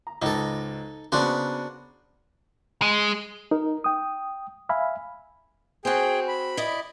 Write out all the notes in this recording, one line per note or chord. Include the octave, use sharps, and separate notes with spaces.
A#5
C#2 G#2 D#4 A4
C#3 A#3 B3 D4 F#4 C5
G#3
D#4 A#4
G5 D#6
E5 F5 G#5 B5
C4 F#4 G#4 G5
B5
E4 D5 D#5